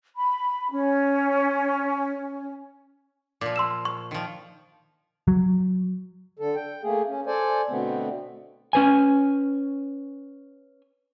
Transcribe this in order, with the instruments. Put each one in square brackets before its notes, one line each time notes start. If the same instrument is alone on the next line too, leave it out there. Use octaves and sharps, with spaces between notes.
[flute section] B5
C#4
[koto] A#2 F3 [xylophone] D6
[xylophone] C6 E6 E7
C#6
[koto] D#3 F3
[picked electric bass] F#3
[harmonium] D3 A4
G5
A3 A#3 G#4
C#4
A4 C5 D5 G#5
B2 D3 A3 B3 C4
[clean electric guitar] C#4 B4 G#5